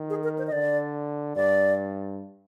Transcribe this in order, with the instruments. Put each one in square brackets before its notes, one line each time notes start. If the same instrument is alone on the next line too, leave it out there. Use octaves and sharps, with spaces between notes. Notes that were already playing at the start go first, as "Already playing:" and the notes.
Already playing: [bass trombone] D#3
[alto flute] G#4
A#4
C5
D#5
[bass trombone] D3 [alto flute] D5
[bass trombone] G2 [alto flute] D5